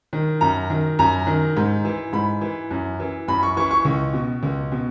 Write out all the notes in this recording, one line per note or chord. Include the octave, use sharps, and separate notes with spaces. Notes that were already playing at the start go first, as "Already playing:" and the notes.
D#3
F#2 A#5
D#3
F#2 A#5
D#3
G#2
E3
G#2 B5
E3
F#2
E3
F#2 B5
C#6
E3 C#6
C#6
C#2
B2
C#2
B2